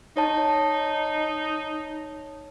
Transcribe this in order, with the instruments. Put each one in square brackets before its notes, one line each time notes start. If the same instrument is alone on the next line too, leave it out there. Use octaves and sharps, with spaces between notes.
[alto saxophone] D#4 [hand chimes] C#5 A5